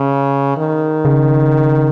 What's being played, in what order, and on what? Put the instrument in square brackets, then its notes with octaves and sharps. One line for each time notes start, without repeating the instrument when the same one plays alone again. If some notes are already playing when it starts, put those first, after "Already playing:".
Already playing: [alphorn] C#3
D#3
[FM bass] C#3